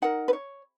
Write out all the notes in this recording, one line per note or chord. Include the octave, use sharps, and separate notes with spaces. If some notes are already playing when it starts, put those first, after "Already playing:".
D#4 A#4 F#5
B4
C#5